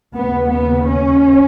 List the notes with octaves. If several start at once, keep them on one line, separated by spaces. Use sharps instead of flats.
D#2 C#3 B3
B3
C#4